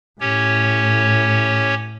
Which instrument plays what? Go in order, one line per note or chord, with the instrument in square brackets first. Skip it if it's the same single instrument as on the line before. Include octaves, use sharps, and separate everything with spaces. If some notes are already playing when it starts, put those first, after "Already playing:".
[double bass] A2 [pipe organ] C#4 G4 C#5